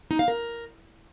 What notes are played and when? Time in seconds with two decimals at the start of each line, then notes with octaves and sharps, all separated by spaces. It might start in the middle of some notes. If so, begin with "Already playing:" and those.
0.11 D#4
0.19 F5
0.28 A#4